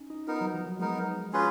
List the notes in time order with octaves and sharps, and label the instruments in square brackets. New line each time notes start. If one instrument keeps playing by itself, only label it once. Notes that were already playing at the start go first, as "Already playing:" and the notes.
Already playing: [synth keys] C#4 D#4
D#4
[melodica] B3 D#4 A#4 [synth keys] F4
[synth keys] F#3
F3
F#3
[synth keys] G#3 [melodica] B3 D#4 A#4
[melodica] C#4 F4 G#4 B4